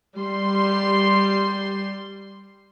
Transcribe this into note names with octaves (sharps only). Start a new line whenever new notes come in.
G3 C6